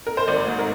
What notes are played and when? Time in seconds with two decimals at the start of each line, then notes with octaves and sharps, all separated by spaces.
0.07 A#4
0.17 C5
0.27 G#1 D5
0.47 G#2
0.59 A#4